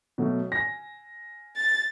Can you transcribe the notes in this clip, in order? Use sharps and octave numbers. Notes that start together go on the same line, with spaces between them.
B2 F#3 A3
G#5 A#6
A6